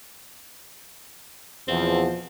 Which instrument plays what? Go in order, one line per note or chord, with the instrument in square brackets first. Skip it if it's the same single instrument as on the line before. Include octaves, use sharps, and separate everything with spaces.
[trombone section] E2 [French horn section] B2 F3 [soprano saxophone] C4